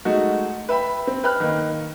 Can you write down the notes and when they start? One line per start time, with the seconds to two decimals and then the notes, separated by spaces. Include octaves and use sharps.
0.05 G#3 A3 D#4 F#4
0.69 B4 E5 G5 B5
1.07 C4
1.24 B4 G5 B5 F6 F#6
1.40 D#3 A#3